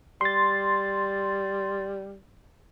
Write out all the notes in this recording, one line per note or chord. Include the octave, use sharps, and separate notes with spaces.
G3 C6 A6